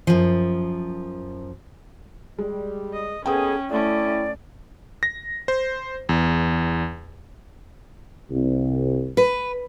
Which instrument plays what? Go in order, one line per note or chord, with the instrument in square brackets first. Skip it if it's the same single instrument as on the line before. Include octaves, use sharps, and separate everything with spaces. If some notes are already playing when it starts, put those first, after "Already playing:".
[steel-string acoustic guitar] F#2 F3
[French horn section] G3 [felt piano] G#3
[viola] D#5
[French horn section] D#2 B3 A4 [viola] C#4 [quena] G#4 [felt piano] G5 D#6
[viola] A3 C#4 [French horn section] E4 [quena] D5
[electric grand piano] A#6
C5
E2
[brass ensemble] C2
[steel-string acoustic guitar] B4